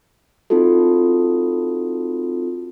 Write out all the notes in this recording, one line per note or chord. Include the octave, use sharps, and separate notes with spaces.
C4 D#4 F4 F#4 A4